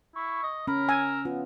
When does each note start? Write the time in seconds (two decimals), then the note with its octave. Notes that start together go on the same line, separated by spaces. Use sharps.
0.16 E4 C#6
0.43 D#5
0.67 C#4 A#4 B5
0.89 G#5 E6
1.25 B3 F4